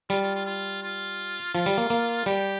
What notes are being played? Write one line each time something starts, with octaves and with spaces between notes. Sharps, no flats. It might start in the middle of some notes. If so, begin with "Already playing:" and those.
G3 F4
F4
F4
F4
F4
F3 F4
G3
A#3
A#3
G3 G4